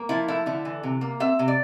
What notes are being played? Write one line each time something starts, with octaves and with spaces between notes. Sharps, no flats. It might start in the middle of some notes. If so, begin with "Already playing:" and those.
Already playing: A#3
F3 E4
A3 E4
D3 E4
E3
C3
A#3
C4 E5
C3
D5